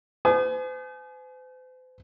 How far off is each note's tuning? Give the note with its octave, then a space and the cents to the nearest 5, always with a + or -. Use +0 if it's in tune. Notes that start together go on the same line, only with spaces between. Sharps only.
C5 -45 G#5 +35 D#6 -35